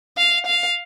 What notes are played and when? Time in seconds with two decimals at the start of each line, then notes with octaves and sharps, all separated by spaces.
0.18 F5
0.47 F5